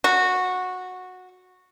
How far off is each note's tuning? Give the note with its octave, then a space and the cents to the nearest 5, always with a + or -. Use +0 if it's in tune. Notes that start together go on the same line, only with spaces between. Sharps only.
F#4 -10